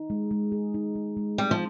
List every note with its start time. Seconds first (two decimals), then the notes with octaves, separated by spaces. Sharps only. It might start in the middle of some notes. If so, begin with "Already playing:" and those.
Already playing: D#4
0.10 G#3
0.31 G#3
0.52 G#4
0.74 D#4
0.95 G#3
1.17 G#3
1.38 G3 C4
1.51 F3